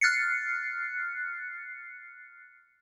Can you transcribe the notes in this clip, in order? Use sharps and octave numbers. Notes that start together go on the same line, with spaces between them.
F6 F#6 A6 C7 C#7